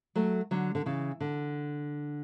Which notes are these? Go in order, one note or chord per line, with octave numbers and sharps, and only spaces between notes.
F#3 A3
D3 F#3
D3
C#3 E3
D3